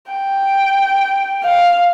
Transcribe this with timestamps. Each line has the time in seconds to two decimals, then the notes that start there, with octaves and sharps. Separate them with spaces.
0.12 G5
1.44 F5